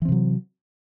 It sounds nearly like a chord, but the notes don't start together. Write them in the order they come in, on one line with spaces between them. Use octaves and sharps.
E3 C4 C3 F#3